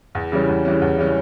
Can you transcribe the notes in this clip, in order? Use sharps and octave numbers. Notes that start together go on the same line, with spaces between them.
E2
C#3 E3 G3 C#4
E2
C#3 E3 G3 C#4
E2
C#3 E3 G3 C#4